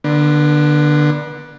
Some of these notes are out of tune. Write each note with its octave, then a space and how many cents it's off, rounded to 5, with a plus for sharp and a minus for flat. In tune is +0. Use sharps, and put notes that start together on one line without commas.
D3 +15 B3 -35